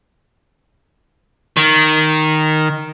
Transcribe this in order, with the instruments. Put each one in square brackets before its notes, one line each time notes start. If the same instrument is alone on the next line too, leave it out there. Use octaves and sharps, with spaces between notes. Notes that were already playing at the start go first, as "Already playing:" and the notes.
[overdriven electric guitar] D#3